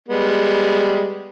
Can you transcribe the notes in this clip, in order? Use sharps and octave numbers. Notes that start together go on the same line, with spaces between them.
G3 G#3 B3